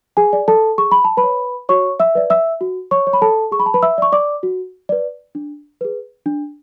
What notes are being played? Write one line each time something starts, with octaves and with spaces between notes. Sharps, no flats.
G#4 G#5
D5
A4 A5
G#4 C#6
B5
A5
B4 B5
C#5
F#4 C#5 C#6
E5 E6
B4 D5
E5 E6
F#4
C#5 C#6
C#5
B5
A4 A5
G#4 C#6
B5
A5
B4 B5
E5 E6
D5 C#6
D5 D6
F#4
B4 D5
D4
G#4 B4
D4